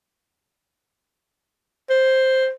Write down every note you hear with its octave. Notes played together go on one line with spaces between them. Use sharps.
C5